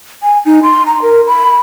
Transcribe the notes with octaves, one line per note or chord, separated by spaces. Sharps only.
G#5
D#4
C6
A#5
A#4
B5